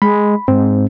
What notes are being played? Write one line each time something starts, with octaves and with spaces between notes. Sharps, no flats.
G#3 B5
G#2 C4